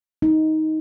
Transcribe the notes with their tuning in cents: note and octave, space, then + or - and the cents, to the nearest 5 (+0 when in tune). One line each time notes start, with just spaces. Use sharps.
D#4 +10